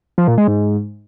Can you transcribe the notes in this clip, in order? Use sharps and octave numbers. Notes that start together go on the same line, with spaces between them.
F3
A#2
G#3
G#2